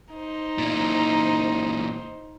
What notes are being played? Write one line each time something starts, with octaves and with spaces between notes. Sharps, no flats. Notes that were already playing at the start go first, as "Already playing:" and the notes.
D#4 C5
A#2 E3